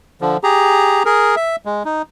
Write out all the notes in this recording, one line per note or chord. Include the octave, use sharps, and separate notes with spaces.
D3 F3
G4 G#4 A#5
G#4 A#4
E5
G#3
D#4